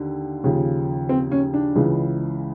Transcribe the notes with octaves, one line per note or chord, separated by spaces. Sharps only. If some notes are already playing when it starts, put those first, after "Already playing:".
Already playing: D#2 D3
D#2 C#3 F3
C4
C#4
D4
C#2 C#3 E3 G#3